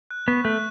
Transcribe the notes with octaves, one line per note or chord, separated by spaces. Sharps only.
F#6
B3 C#6
A3 F#6